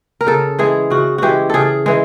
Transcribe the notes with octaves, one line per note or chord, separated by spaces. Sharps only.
A#4
C#3 A4
E3 G#3 G#4
C#3 F#4
E3 G#3 F#4 G4
C#3 G#4 A4
E3 G#3